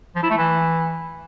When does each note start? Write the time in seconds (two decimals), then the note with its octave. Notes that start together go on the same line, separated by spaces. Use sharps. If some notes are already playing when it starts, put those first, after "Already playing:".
0.16 F3
0.23 E4
0.30 A3
0.37 E3